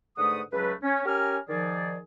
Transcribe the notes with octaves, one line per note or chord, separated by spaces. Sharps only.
G#2 D3 A3 B4 F#5 D#6
C#2 F#3 A3 B4
C#4
C#4 G4 A#4 G#5 A#5 F6
D#3 F3 G#4 D5